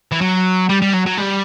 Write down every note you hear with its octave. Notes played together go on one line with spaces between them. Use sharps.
E3
F#3
G3
G3
F#3
F#3
G3